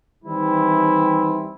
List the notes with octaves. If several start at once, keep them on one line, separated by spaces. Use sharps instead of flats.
D#3 E3 G3 C4 E4